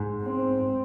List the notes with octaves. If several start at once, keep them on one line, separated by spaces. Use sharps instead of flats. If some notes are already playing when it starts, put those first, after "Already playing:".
Already playing: G#2
C4